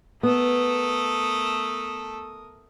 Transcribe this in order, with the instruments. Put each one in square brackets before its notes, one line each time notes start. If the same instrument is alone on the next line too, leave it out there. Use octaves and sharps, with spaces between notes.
[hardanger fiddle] A3 A4 [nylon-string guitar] B3 [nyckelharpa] A#4 D#6